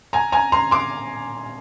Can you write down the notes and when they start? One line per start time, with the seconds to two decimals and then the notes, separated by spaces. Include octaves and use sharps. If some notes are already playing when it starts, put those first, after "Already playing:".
0.13 G#5 A#5
0.32 G#5 A#5
0.52 A#5 C6
0.71 C6 D6